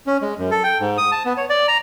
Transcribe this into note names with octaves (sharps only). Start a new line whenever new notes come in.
C#4
G#3
F#2
A4
G5
G#2
D#6
A5
B3
C#5
D5
A#5